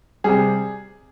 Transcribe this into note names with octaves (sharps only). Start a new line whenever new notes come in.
C3 G3 G#4